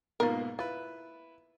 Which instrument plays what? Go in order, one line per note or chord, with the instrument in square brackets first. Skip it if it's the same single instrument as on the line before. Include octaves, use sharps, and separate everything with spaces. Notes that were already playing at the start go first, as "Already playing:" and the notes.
[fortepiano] G#2 B2 A#3 [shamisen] F4 A#4
[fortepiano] E4 B4 [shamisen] F4